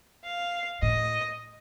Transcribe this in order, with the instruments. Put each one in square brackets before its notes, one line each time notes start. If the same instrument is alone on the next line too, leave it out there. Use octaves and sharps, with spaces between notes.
[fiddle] F5
[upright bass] A2 [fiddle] D#5